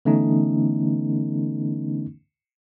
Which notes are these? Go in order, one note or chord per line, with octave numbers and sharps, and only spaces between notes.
D3 E3 A3 B3 C#4 D#4